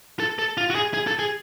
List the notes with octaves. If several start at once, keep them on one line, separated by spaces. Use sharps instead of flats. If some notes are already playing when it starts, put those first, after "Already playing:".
A4
A4
F4
F#4
G#4
G#4
A4
G#4